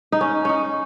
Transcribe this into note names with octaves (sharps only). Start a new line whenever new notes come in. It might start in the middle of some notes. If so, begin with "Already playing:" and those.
D#4
C#4
C#4 D#4